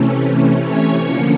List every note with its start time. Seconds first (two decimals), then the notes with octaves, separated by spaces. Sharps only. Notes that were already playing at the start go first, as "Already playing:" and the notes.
Already playing: C3 E3 A3 C#4
0.62 C#5 C#6
1.04 D3 F3 A#3 C#4